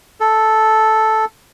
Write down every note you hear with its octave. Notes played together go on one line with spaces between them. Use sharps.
A4